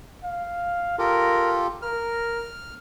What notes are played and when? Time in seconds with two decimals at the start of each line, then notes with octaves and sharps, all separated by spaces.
0.24 F5
0.99 F4 G4 A4 A#4
1.82 A#4 F6